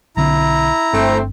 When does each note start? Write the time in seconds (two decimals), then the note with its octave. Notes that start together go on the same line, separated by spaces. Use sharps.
0.17 B1 D3 C4 E4 A#5
0.93 G1 A3 C4 D4